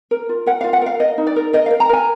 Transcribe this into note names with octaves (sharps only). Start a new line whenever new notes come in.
A#4
F4
A#4 F#5
F5
F4
F#5
A#4 F5
A#4 D#5
D#4
D5
A#4
A#4 D#5
F5
A#4
A#5
A#4 G#5